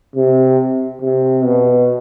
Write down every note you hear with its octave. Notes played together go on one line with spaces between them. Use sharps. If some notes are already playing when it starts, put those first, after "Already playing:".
C3
C3
B2